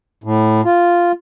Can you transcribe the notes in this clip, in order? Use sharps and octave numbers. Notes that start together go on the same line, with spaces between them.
A2
F4